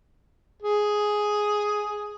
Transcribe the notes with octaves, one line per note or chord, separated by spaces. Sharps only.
G#4